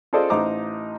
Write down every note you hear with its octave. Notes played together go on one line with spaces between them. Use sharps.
F4 G#4 A4 C5 D5 D#5
A1 D#4 C5 A#5 D6